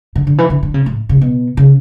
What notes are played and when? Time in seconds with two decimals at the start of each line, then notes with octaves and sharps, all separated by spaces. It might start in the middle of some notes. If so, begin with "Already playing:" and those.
0.16 D3
0.27 D3
0.38 E3
0.50 D3
0.63 D3
0.74 C#3
0.86 A2
1.09 C#3
1.22 B2
1.57 C#3